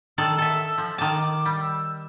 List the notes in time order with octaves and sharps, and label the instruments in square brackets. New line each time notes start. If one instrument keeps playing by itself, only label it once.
[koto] D#3 A4 D5 [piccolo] E6
[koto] A4 E5
F3
[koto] D#3 A5 [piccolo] D6
[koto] G3
[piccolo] E6